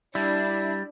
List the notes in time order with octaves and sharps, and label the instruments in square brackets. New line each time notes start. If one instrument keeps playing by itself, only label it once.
[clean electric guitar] G3 [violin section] D4 [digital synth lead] E4